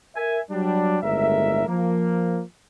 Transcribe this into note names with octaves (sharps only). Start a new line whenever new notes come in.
A#4 E5 G#5
F#3 G3 D4
G1 D#2 A2 G#3 A#4 E5
F3 A#3